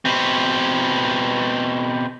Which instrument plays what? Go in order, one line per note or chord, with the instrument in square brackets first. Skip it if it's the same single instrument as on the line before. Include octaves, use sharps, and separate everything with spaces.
[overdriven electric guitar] B2 C4